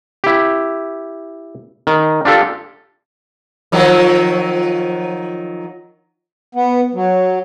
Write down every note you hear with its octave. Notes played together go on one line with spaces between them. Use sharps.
E4 G4
D#3
D4 F4 G4 A4
D#3 F3 F#3
B3
F#3